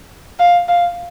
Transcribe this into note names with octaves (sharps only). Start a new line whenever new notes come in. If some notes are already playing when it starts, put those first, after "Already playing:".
F5
F5